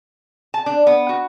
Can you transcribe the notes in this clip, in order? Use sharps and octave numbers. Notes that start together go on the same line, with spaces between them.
A5
D4
B3
F#4